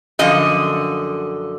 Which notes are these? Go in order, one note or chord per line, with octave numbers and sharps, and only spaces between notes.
F#2 D3 F3 D#5